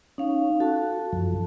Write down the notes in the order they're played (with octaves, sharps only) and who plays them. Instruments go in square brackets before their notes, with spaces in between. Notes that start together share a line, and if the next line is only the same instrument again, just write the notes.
[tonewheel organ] C#4 [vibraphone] D#4 F5
[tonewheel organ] F#4 [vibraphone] A4 A5
[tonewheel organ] F#2 F3